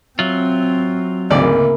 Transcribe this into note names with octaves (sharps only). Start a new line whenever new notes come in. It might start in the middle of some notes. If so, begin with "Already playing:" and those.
F#3 C4 F4 E5
G#1 D2 C#3 A#3 E4 G#4 D5